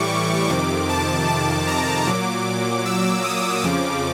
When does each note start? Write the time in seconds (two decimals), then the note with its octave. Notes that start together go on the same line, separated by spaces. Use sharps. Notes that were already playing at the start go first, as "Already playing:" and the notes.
Already playing: A2 E3 G3 C#6 D6
0.49 F2 C3 D#3 D6
0.89 A5
1.28 A5
1.67 A#5
2.07 A#2 F#3 D6
2.86 E6
3.24 D#6
3.63 F2 C#3 F3 D6